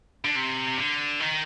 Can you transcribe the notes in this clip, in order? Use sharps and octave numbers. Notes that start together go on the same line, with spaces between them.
D3
C3
D3
D#3